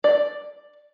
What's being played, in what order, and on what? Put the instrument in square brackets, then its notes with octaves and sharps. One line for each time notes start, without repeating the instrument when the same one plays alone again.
[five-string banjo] D5